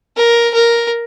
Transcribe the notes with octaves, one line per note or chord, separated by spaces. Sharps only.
A#4
A#4